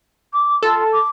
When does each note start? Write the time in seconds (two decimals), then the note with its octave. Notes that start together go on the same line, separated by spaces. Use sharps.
0.33 D6
0.63 F4 A4
0.92 D6